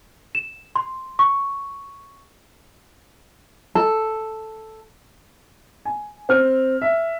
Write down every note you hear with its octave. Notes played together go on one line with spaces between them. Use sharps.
E7
C6
C#6
A4
G#5
C4 F6
E5